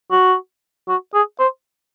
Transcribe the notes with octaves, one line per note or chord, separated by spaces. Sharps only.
F#4
F#4
G#4
C5